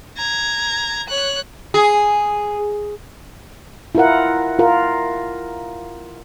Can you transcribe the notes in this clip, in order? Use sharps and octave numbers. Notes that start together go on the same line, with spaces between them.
A#5 G#6
C#5 F#6
G#4
E4 F4 A#4 F#5
F4 A#4